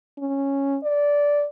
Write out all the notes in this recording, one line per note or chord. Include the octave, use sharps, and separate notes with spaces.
C#4
D5